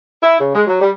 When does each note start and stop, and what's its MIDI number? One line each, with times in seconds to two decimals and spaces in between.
0.23 0.39 64
0.40 0.53 49
0.55 0.63 56
0.67 0.79 54
0.81 0.91 55